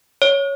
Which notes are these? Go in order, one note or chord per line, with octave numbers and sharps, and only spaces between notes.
C#5